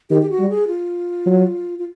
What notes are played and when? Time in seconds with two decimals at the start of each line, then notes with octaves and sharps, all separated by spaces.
0.10 D#3 G4
0.22 G4
0.30 F#4
0.39 G3
0.49 G#4
0.68 F4
1.26 F#3
1.79 F4